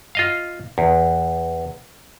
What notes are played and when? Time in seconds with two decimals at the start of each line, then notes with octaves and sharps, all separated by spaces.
0.15 F4 D#5 F5
0.78 E2